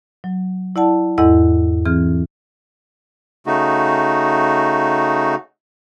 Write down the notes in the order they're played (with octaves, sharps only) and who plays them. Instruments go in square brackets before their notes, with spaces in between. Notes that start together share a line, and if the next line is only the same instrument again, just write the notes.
[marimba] F#3
E4 D5 F#5 A5
E2 G#2 E4 A4 D#5 F#5
E3 C4 G#4 F6
[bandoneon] C#3 A3 D#4 F#4